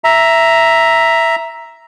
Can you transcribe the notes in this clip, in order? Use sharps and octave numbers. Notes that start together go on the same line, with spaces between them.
E5 A#5